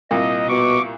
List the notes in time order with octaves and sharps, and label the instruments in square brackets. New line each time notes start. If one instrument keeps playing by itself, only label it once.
[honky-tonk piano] C2 A#2 [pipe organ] D#5
[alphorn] B2 [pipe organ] C#6 D6